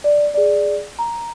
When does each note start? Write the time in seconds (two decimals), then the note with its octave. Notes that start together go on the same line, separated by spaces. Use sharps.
0.04 D5
0.34 G#4 D5
0.99 A#5